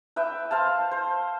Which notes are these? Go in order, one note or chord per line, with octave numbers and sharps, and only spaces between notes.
B4 E5 G5
C5 F5 A5
C5